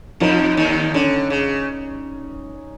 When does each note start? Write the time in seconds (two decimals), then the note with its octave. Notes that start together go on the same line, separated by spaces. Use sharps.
0.20 F2 F3 D#4
0.57 D#2 D#3
0.94 D3 C#4
1.30 C#3